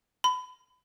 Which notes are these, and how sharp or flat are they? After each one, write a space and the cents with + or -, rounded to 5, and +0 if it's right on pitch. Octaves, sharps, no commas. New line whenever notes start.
B5 +30